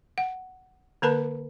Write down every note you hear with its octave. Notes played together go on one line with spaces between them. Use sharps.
F#5
D3 A#3 A#4 B4 A5 B5